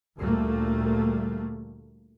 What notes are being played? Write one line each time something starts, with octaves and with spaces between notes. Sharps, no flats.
D2 A#2 G3 A3 A#3